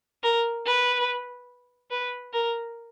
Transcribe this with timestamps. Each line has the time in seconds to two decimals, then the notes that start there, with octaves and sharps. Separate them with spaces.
0.23 A#4
0.66 B4
1.91 B4
2.33 A#4